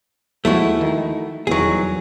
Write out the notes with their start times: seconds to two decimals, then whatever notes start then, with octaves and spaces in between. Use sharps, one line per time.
0.45 D#2 F3 G#3 A3 E4 F#4
0.81 D#3
1.47 D#1 E2 D#3 F#3 G#4